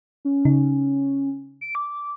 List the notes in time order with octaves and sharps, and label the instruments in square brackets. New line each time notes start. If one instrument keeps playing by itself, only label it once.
[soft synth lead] C#4
[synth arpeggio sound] C#3 D#4
[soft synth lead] D7
D6